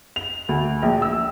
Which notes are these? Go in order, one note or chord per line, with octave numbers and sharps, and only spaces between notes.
F7
D2
A#1
E6